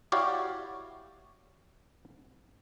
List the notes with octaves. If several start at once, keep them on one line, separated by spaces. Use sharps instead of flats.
E4 F#4 G4 C#5 D5 F5